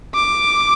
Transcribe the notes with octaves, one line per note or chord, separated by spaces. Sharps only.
D6